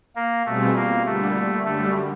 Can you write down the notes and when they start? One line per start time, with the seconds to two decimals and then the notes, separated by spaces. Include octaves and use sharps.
0.16 A#3
0.45 B2 G3 A3 C4 F4 G#4
0.76 A#3
1.05 D3 G3 A3 A#3
1.64 F#2 D3 G3 A3